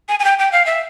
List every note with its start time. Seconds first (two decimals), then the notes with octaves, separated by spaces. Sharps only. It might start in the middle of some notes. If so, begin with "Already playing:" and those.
0.09 G#5
0.20 G#5
0.25 G5
0.39 G5
0.52 F5
0.66 E5